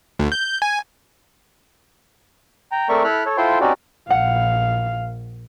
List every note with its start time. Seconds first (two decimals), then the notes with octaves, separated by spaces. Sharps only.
0.19 D2
0.32 G6
0.62 G#5
2.72 G5 A#5
2.89 A3 C4 A#4 D5 E5 C#6
3.04 E4 A4 B5 F6 F#6
3.26 A4 C#5
3.37 E4 F4 A4 C5 G5 C6
3.61 C4 C#4 D#4 F#4 G4 D5
4.10 A#1 F5 F#5